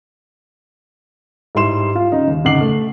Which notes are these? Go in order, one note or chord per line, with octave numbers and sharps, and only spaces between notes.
G#2 G3 E4 C6 E7
F4 F5
C#3 D#4
D#2
F#1 D#4 F#5 D6 C7 F#7
A3